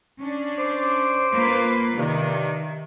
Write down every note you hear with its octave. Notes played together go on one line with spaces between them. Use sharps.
C#4 D4
C5 D6
A#3 F4 B4
G2 C3 D#3